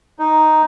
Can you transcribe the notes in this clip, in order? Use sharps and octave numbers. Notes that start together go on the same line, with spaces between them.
D#4